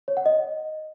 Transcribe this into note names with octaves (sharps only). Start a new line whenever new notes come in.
C#5
F#5
D#5